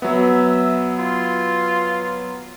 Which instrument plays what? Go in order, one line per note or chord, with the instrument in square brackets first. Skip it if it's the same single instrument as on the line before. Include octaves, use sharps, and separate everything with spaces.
[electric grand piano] F#3 B3 [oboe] E5
[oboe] F4